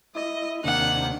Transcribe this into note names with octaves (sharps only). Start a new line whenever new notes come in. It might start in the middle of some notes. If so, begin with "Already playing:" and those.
E4 D#5
D#2 C3 D#3 A#3 D4 F#5